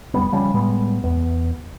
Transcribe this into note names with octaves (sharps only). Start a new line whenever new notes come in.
F1 G3 B3
C#3 F3 G3 C#4
A2 G3 G#3 B3
E2 B3